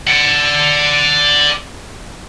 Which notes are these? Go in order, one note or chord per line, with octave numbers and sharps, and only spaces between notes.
D5 F#5